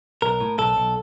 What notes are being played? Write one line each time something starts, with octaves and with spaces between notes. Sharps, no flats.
B1 A#4
A2
B1 A4
B1